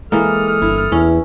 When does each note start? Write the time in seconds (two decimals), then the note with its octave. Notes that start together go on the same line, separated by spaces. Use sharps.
0.12 E3 G#3 A#3 A4 D#6 F6
0.62 G1 E4
0.92 E2 B3 C#4 E4